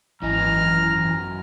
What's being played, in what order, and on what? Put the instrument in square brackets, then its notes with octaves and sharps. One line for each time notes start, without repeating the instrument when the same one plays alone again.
[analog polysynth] G#1 E3 G#5 [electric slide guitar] F#2 C#4 D#5 [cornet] A#5 [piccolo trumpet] F6